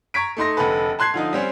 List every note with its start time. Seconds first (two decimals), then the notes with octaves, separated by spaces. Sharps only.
0.14 A#5 C#6 G#6 B6 D7
0.37 A3 D#4 C6 A#6
0.57 F1 D3 A4 B4
0.99 A5 C6 F#6 G#6 C7
1.14 D3 F3 D#4
1.33 G3 C4 C#4